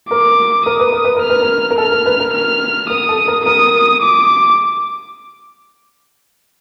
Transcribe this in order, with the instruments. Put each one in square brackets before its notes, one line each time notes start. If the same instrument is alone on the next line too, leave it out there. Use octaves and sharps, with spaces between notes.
[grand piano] A#4 [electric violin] D6
[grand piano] A#4 [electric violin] D#6
[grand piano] B4
A#4
B4
A#4
[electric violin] F6
[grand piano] B4
A#4
A#4
[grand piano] A4 [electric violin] F6
[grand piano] A#4
B4
A#4
[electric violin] F6
[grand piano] A#4 [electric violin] D#6
[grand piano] A4
A#4
[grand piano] A#4 [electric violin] D#6
[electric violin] D6